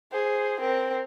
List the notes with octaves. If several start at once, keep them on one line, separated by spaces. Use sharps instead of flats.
G#4 C5
C4 A#4